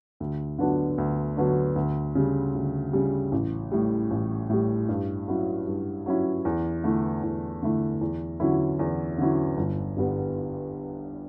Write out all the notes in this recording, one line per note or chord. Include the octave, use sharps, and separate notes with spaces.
D2
D3 F#3 B3 D4
D2
D3 F#3 B3 D4
D2
C#3 G3
D2
C#3 G3
A1
A2 G3
A1
A2 G3
G2
F#3 C#4 E4
G2
F#3 C#4 E4
E2
D3 A3 E4
E2
D3 A3 E4
E2
D3 F#3 C#4 E4
E2
D3 F#3 C#4 E4
G1
G2 D3 G3 B3